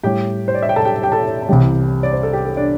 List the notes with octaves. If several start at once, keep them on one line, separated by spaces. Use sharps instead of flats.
A2 G3 G4 G5
C5
D5
E5
G5
A4 A5
G4 G5
G4 G5
A4 A5
A5
C2 C3 E3 G3 G4 G5
D5
C5
A4
G4
A4
D4 D5